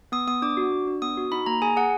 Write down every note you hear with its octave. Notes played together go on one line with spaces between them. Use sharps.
B3 D#6
B3 D#6
D4 D6
F#4
D4
D4
B3 D#6
F#4
D#4 B5
A#3 A#5
G#4 G#5
G#4 F#5